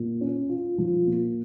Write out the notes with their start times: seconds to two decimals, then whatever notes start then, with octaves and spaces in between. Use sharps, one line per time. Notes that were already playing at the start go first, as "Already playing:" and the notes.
Already playing: A#2
0.21 C#4
0.49 F4
0.78 F3
1.07 A#2